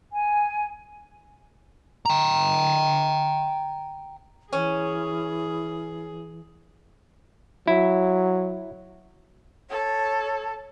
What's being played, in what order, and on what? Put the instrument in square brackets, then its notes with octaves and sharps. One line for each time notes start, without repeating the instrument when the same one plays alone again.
[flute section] G#5
[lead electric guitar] G5 A#5
[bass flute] E3 [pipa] C#4 [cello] G#4
[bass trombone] F#3 [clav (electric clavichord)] E4
[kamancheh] A4 [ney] C#5